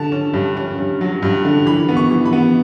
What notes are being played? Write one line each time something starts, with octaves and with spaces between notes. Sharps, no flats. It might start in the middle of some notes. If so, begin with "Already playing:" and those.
Already playing: D3 A5
C#4
G2
C#4
G2
F#3
G2
D3
E3 B5
B3
C#6
E3
B5
B3